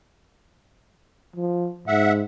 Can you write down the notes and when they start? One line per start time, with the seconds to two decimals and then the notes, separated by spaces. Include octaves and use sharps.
1.36 F3
1.88 G#2 E5 F#5